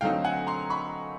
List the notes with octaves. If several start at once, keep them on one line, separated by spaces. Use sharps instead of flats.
D3 F#3 A3 C4 D#4 F5 G5
F#5 G#5
A#5 C6
B5 C#6